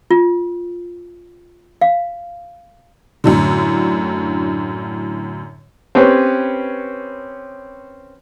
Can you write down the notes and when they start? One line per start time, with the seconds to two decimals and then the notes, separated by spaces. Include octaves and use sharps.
0.11 F4
1.81 F5
3.24 F#2 A2 D3
5.95 C4 C#4 G4 B4 C#5